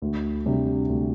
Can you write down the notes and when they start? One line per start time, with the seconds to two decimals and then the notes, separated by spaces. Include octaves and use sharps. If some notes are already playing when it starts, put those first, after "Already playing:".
0.02 D2
0.46 C3 G3 D4
0.89 D2